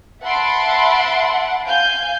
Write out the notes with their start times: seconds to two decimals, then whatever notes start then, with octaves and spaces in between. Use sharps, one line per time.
0.22 E5 F#5 A5 B5 C6 D7
1.66 F5 G#5 G6